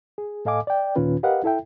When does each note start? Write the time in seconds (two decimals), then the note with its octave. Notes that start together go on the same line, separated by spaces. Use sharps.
0.18 G#4
0.45 A2 A4 D#5 F5 G#5 D6
0.67 D5 G5
0.96 D#2 A#2 D#3 C#4 F4 B4
1.23 G4 A#4 B4 D#5 F5 F#5
1.44 E4 A4 E5 G5